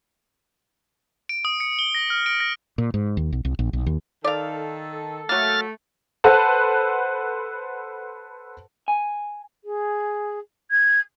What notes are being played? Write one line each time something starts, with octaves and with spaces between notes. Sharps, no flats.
D7
D#6
C#7
G7
A#6
F6
D7
A#6
A#2
G#2
D#2
B1
C2
A#1
B1
D#2
D#3 A4 D5 F5
F#3 A3 A#3 F6 A6
A4 B4 C5 F#5 A5
G#5
G#4
G#6